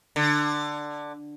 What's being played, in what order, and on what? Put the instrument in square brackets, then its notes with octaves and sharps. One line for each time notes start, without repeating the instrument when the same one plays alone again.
[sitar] D3